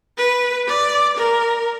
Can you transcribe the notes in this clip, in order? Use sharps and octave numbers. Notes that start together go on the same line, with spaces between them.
B4
D5
A#4